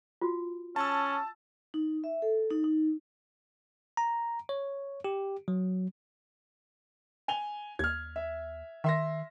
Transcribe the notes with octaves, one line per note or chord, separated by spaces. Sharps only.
F4 F#4
C#4 A5 E6
D#4
E5
A4
D#4
D#4
A#5
C#5
G4
F#3
G#5 F7 G7
D#2 F6 G#6
E5
D#3 E5 C6 A#6